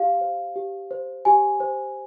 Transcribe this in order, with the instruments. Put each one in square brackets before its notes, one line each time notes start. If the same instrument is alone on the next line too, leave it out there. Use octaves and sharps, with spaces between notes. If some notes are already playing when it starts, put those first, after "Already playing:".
Already playing: [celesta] G4 F5
C5
G4
C5
G4 G#5
C5